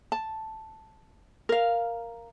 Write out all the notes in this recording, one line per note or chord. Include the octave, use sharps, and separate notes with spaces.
A5
A#4 F5